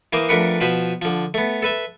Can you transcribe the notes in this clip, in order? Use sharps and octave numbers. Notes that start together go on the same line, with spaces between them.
E3 A#3 C5 A#5 D6 D#6
F2 A3 D4 A#4 B4 F#5
B2 F3 B4 C5 B5
D3 F3
A3 B3
A4 B4 E5